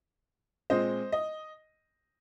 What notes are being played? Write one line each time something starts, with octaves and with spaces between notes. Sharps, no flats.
A#2 G#3 C4 C5 D#5
D#5